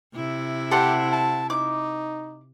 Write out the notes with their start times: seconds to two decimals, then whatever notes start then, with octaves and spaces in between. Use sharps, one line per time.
0.15 C3 E4
0.71 G4 A4 C5 F#5
1.12 A5
1.50 D#4 D6